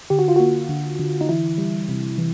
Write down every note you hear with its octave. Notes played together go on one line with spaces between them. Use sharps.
D3 G4
F#4
F4
A#3 F#4
D3
D3
D#4
E3 E4
G3
C3
E3